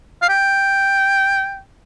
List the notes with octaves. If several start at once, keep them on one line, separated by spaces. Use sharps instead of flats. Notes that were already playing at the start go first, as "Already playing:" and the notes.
F5
G5